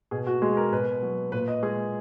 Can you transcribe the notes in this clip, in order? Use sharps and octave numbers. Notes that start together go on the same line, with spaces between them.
B2 G#4
F#4
G#3 G#4
A#4
B2 B4
F#3
A#2 B4
D#5
G#3 G#4